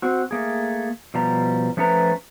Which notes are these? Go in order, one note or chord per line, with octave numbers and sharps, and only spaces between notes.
C4 F#4
A3 A#3 G#4
B2 F3 G3 A#5
F3 A3 C#4 B4 A#5